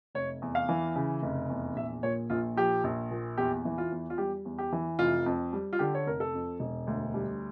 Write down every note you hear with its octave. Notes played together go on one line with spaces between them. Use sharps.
F1 C#5
E2
F5
E3
C#3
F1
E2
A#1 E5
A#2 C#5
A#1 F4
F3 G4
A#1
A#2
E2 G4
E3
F4
E2
F4
G3 G4
E2
G4
E3
F1 F4
F2
G3
F4
D3 G4
C#5
F1 A#4
A4
F2
E1
D2
G3